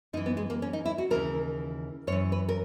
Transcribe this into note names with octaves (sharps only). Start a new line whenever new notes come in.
F#2 E3 D#4
B3
G#3
A#3
C#4
D#4
E4
F#4
D#2 C#3 E3 A#4
F#2 E3 C#5
B4
A#4